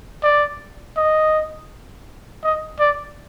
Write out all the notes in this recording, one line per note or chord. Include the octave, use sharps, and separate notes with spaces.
D5
D#5
D#5
D5